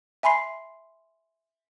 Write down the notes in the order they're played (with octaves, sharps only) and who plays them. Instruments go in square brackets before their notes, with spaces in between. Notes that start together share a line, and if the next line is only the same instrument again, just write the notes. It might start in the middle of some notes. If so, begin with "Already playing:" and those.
[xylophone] E5 G#5 B5 C6 C7